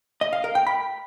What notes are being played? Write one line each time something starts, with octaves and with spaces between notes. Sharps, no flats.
D#5
F5
A#4
G5
B5